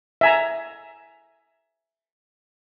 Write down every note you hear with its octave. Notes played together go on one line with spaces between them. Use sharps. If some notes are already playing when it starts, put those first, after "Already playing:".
E5 G#5 A#5